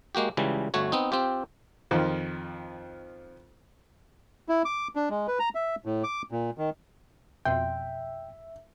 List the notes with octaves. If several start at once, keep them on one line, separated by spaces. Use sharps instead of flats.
G#3 A#3 F#4 G4
C#2 C#3 E3 G3
G1 A3 F#4 C#5
B3 C4 D#4
C4 F4 G4
F2 D#3 F3
E4
D6
D4
G#3
B4
A#5
E5
A2
D6
A#2
D#3
F2 B2 E5 G5 C6